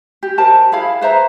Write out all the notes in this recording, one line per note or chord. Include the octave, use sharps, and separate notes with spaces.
G4
G4 A#4 C5 A5
E4 G#4 F5 B5
B4 C5 E5 A#5